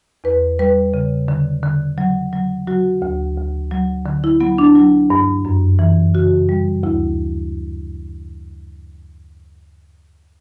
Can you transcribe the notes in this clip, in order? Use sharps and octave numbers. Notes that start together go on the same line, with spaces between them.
E2 B4
G3 B4
C#3
D3
D3
F#3
F#3
F#3 F#4
D2
D2
F#3
D3
E4
F#3 B3
D4
F#3
G2
F#2
E3
C#3 F#4
G3
D2 E4